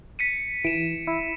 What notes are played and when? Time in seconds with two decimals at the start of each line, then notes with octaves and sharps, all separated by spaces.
0.19 B6 C#7 D#7
0.65 E3 D7 E7
1.07 E4